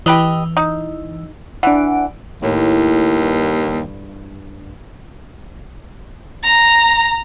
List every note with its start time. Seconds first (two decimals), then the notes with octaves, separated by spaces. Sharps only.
0.06 E3 G4 B4 D#5
0.57 D#4
1.63 E3 D4 F#5
2.42 D#2 A2
3.21 G2
6.44 A#5